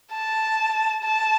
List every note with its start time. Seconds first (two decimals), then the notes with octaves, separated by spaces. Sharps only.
0.12 A5
1.04 A5